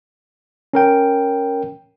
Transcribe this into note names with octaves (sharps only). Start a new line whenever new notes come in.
C#4 A#4 G5